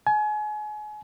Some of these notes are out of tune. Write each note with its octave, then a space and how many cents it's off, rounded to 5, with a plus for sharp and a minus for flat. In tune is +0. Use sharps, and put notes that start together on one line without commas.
G#5 +30